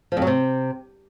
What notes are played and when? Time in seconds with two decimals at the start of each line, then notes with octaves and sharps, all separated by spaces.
0.12 F3
0.17 F2
0.22 F#3
0.27 C3